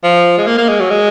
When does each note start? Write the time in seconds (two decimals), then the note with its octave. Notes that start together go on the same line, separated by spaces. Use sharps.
0.04 F3
0.38 G#3
0.47 A#3
0.58 A#3
0.69 G#3
0.80 F#3
0.90 G#3